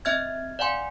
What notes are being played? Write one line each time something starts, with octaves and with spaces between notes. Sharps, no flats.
C4 D#5 E5 F6 G#6
D5 F5 F#5 G#5 C6